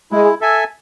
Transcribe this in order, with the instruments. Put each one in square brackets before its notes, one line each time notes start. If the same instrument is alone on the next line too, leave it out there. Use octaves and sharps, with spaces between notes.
[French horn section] G#3 [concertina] E4
[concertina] A4 E5 G#5